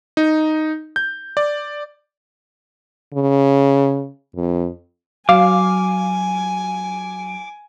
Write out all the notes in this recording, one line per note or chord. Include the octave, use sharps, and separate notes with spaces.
D#4
G6
D5
C#3
F2
F#3 F5 G#5 D6